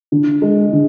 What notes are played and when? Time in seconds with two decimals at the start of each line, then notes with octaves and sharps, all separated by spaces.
0.12 D3
0.42 G#3
0.73 D3